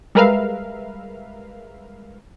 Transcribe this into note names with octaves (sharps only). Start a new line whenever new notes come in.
G3 G#3 A#4 B4 E5 F5